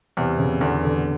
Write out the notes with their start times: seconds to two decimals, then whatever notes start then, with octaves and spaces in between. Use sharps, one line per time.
0.17 E2 C3
0.39 C#3
0.61 E2 D3
0.83 D3